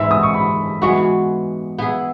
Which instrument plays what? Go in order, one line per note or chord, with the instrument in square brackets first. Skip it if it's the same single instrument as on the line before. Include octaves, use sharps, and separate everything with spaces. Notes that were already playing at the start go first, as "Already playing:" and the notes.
Already playing: [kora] G#2 E3 G#3 [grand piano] E5
[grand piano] D#6
C#6
B5
[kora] E3 G#3 B3 F#4 [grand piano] C#6
[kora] B3 E4 G#4